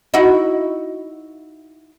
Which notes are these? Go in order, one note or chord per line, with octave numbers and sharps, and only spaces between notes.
D#4 E4 F#4